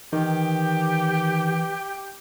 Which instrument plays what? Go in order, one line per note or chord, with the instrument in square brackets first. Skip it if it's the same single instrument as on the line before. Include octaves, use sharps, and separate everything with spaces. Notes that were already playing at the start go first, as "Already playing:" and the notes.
[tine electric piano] D#3 [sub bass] E3 [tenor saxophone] G4